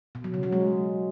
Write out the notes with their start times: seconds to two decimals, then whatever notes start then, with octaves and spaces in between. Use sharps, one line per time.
0.15 B2
0.24 F#3
0.34 C#3
0.43 F#3
0.52 G#3